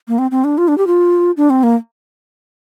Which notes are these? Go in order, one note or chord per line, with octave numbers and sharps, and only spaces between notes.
A#3
C4
C4
D4
F4
D4
G4
F4
D4
C4
A#3